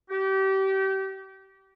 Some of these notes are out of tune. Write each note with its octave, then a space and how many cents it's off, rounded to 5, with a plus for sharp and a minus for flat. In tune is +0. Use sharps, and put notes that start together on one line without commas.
G4 -30